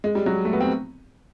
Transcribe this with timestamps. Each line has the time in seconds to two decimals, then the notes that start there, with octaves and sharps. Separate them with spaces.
0.04 G#3
0.15 G3
0.26 F#3
0.45 A3
0.53 B3
0.60 C4